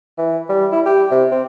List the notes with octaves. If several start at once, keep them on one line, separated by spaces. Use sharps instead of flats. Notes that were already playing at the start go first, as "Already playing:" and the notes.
E3
G3
E4
G4
C3
C4